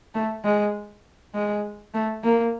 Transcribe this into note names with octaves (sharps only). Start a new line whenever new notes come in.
A3
G#3
G#3
A3
A#3